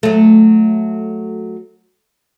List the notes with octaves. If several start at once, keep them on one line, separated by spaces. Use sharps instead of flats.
F#3 A3